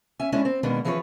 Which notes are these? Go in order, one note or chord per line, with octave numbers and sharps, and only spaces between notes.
C#4 E5 G#5
G#3 C#4 D4 E4 G#4
C4
B2 D#3 G#3 A#3 B3 D4
E3 F3 G#4 A4 B4 C#5